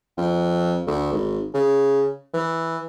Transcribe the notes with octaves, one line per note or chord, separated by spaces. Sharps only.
F2
D2
G#1
C#3
E3